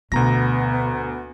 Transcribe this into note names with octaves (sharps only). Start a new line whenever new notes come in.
D2 B2 B3 A#5 A#6